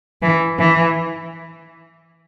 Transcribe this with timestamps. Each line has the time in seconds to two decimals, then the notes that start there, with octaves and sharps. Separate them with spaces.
0.22 E3
0.58 E3